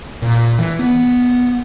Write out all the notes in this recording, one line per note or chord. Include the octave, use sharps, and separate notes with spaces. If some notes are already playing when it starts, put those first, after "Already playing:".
A#2
E3
B3